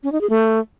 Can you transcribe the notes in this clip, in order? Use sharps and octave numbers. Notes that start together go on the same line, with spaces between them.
C#4
D#4
G#4
A3